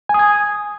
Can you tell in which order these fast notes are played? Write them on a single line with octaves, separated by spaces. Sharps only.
G#5 D#6 G#6